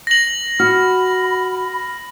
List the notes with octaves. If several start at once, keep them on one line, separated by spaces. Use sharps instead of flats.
A#6 F#7
F#4 B5 F6